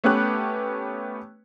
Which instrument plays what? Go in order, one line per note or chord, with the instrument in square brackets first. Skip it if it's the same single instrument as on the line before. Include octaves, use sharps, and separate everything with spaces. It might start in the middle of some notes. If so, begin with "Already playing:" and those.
[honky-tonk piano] A3 B3 C#4 G4 B4 F#6